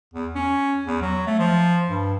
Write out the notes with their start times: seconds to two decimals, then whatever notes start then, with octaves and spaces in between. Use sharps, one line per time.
0.14 E2
0.35 C#4
0.86 E2
1.02 F#3
1.27 A3
1.39 F3
1.88 G2